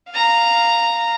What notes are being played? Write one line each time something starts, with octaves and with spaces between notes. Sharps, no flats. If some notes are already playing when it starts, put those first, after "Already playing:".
F5 A#5